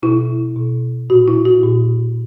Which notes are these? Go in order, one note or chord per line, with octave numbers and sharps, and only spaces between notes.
B2 E4
B2
A#2 F#4
E4
F#4
A#2